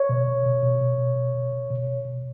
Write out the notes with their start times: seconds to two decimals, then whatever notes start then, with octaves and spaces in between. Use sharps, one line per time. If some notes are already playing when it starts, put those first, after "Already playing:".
Already playing: C#5
0.09 B2
0.27 B2
0.46 B2
0.63 B2
0.81 B2
0.99 B2
1.16 B2
1.35 B2
1.52 B2
1.70 B2
1.87 B2
2.05 B2